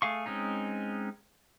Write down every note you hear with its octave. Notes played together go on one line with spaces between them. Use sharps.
A3 G#4 F5 C#6
G#3 C4 C#4 D#4